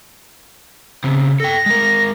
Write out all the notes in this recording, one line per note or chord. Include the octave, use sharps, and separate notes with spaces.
C#3 C4
A4 G5 A#6
G#3 A#4